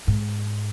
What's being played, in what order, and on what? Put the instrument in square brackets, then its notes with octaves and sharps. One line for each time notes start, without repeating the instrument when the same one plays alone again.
[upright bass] G#2